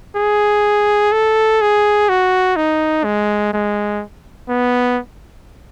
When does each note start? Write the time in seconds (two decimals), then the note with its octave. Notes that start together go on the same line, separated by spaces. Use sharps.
0.16 G#4
1.12 A4
1.61 G#4
2.09 F#4
2.56 D#4
3.04 G#3
3.53 G#3
4.49 B3